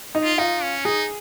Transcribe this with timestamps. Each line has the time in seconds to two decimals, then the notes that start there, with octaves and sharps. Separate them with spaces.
0.15 D#4
0.23 F4
0.38 D#4 F4
0.62 C#4
0.85 D#4 G#4